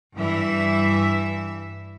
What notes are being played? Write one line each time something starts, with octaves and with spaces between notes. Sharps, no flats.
G2 E3 E5